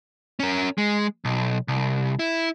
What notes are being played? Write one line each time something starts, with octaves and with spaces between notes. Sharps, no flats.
C#4 A#4
G#3
B1
C2
E4